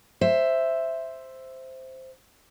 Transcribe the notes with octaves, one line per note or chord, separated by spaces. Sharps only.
C5 E5